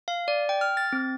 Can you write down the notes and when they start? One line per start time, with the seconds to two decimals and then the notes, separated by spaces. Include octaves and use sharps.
0.08 F5
0.28 D5
0.49 G5
0.61 F6
0.77 A6
0.93 C4